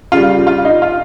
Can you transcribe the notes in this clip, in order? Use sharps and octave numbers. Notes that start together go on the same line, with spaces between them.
C#3 G3 F4
F4
D#4
F4